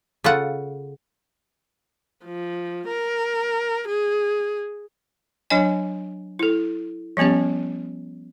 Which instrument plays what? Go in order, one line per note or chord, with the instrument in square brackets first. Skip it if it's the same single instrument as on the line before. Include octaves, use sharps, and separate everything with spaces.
[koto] C#3 F4 A4 F#5
[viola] F3
A#4
G#4
[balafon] F#3 D4 C#5 D#5 G#5
E4 A4
F3 G3 B3 C#4 G4